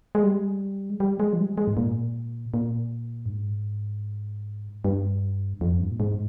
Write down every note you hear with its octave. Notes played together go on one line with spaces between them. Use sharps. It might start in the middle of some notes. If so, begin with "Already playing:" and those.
G#3
G3
G#3
G3
G#3
F3
G3
G#3
G#2
A#2
A#2
G2
G#2
G2
F2
G2
A#2
G#2